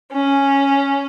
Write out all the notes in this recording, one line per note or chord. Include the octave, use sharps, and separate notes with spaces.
C#4